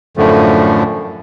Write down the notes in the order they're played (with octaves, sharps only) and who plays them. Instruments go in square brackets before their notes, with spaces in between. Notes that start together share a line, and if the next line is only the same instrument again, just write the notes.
[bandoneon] F#2 A2 D3 F3 A3